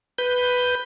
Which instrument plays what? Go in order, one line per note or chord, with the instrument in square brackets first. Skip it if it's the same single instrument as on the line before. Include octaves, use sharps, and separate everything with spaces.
[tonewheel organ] B4 G6